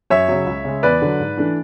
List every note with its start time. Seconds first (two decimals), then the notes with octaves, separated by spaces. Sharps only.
0.10 F#2 C#5 E5
0.28 C#3 F#3
0.46 C#2
0.64 C#3 G#3
0.83 E2 B4 D5
1.02 D3 F#3
1.20 G#2
1.37 E3 A3 D4